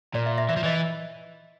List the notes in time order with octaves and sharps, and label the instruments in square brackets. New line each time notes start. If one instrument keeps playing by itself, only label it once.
[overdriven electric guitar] A#2 [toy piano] D5
[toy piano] E5
E5
[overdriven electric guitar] E3 [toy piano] E5
[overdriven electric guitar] F3
[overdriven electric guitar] E3 [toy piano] D#5